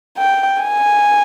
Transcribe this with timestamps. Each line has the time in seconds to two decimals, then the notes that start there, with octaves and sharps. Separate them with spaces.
0.18 G5
0.63 G#5